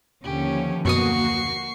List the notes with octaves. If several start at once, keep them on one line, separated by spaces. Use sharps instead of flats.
D#2 D3 F3 C#4 G4
F#2 B2 A#3 F#4 C#6 D#6 C7